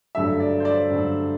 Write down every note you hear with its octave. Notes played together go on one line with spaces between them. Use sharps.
G2 D3 F#3 A3 E5
D5
C5
D5
G2 D3 F#3 A3